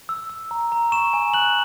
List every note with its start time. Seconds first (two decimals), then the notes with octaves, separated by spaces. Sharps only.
0.09 E6
0.30 E6
0.51 A#5
0.72 A#5
0.92 C#6 E7
1.13 G#5
1.34 F#6 F#7